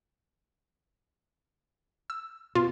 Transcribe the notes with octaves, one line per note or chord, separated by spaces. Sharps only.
E6
B2 F4